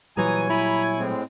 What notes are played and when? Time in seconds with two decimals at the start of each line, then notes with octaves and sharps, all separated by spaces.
0.17 A#2 E3 F#3 G3 C#5 G#5 A#5 D#6
0.50 E4 A#5 B5
0.98 A2 G#3 C4